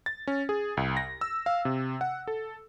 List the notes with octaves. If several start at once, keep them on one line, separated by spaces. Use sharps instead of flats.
A6
C#4
G#4
C2
A#6
E6
F5
C3
F#5
A4